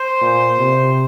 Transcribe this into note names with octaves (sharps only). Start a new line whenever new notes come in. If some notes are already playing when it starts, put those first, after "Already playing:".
Already playing: C5
A#2
C3